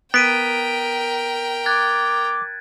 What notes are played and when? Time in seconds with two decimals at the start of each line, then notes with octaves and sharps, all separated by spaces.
0.14 B3 A#4 G5 B6 D7 D#7
1.66 D6 F#6 G#6 A6